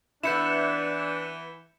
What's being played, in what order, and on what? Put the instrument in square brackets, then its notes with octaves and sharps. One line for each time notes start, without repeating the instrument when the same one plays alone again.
[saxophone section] E3 [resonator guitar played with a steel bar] B3 E4 [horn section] D4 [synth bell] G6 C#7 E7